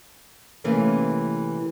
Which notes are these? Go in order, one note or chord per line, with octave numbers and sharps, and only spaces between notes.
C3 E3 A3 A#3 C#4